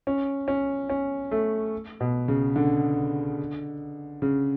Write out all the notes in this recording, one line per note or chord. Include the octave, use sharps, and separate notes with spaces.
C#4
C#4
C#4
A3
B2
C#3
D3
C#3